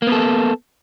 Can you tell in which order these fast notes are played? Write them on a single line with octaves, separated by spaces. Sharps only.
A#3 B3 A4